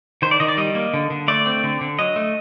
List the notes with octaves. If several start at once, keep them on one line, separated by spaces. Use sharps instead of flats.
D#3 C5
D5
D#3 D#5
D5
G3 D#5
A#3
D3
D3
A3 D5
C4
D3
D3
F#3 D#5
A3